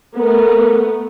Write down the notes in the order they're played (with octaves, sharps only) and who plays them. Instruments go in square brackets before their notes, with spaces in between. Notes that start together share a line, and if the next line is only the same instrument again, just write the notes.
[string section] A3 B3 [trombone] A#4